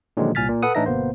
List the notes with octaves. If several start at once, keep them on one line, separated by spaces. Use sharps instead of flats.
A#2 D3 D#3 F3 F#3 G#3
C2 A#2 G#5 F6 A6 B6
A#2
A4 B4 F#5 D#6
A2 E3 D4 D#4 E5 A#6
G1 B2 A#3 B3 C5